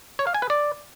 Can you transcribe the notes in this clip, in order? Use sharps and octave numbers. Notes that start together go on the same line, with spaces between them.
C#5
F5
G#5
B4
D5